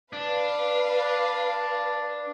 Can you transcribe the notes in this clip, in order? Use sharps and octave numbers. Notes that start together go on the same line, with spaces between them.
D4 B4 F5